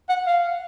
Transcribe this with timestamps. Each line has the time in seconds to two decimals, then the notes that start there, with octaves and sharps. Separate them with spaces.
0.09 F#5
0.26 F5